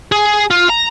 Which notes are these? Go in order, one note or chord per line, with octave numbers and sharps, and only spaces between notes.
G#4
F4
A#5